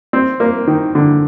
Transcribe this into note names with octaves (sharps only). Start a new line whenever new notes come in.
C4
A#3
D#3
D3